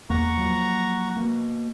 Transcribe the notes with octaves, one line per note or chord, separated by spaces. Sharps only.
E2 A#3 F#5 A#5 C#6
F3 F#3 A#3
B2 A#3